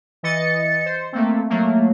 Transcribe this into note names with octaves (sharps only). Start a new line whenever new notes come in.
E3 D#5 A6 C#7
C5
A3 A#3 C4
F#3 A3 A#3